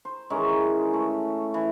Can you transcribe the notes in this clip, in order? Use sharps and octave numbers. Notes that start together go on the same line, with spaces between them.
C5
D#3 E3 G#3 C#4
A3
E3